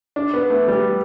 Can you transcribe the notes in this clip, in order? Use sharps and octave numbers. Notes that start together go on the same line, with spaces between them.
D4
B3
A3
G3